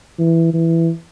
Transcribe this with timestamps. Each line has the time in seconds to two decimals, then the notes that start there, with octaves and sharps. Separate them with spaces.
0.19 E3
0.53 E3